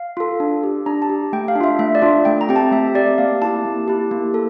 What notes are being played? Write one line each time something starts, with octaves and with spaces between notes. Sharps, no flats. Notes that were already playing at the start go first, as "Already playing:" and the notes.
Already playing: F5
F4 A4
D4
G4
D4 A#5
A5
G4
A3 G5
F5
D4
F4 E5
A3 E5
D5
D4 F4
A3 G5
A#5
C4 G4 G5
A5
A3 E5
C4 G4 D5
A#3 F5
E4 G4 A5
A#3
E4 G4
A#3
A4